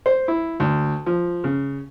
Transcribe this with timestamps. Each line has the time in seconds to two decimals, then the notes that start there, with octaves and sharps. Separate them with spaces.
0.06 C5
0.28 E4
0.60 D2
1.06 F3
1.44 C#3